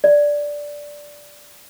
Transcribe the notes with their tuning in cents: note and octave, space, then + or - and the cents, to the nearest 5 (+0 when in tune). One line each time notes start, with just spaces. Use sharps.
D5 -5